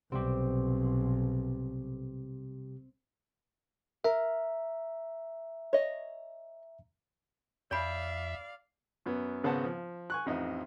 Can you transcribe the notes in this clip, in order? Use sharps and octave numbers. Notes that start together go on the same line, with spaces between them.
B1 C3 G3 C4 G4
A#4 E5 A#5
C#5 D#5
F2 C#5 D5 E5 F5 G#5 B5
F#2 B3
G#1 C#3 B3 C5 F#5 A5
F3
G#5 C#6 F#6
A1 F2 D#4 D#5 E5